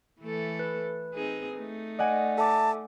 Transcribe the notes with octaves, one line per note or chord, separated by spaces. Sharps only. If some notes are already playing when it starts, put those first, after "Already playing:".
E3 A3 A4
B4
C4 D#4 G#4
A3 D#4
D5 D#5 F#5 G#5
A4 E5 A5 D6